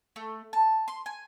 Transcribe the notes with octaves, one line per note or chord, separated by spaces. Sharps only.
A3
A5
C6
G#5